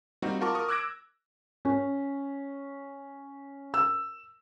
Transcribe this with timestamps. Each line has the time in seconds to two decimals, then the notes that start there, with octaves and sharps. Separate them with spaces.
0.22 G3 A#3 C4 D#4 F#4
0.41 F4 F#4 A#4 A5 C#6 D6
0.55 A#4 C#6 D#6
0.68 D6 E6 F#6 G#6 A#6 D7
1.65 C#4
3.74 E6